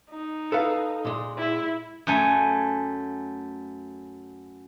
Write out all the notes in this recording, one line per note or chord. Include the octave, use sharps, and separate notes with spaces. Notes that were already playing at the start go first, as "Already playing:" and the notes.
D#4
A4 B4 F5
A#2 G#3
E4
F#2 A3 G#5